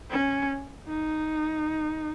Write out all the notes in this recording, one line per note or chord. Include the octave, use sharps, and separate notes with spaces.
C#4
D#4